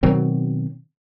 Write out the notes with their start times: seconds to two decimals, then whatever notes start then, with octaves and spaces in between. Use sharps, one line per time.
0.03 B2 D#3 F#3 C4